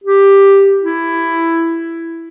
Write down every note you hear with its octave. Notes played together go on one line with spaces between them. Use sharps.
G4
E4